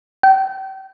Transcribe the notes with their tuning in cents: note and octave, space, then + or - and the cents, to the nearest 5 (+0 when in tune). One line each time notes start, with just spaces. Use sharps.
G5 -35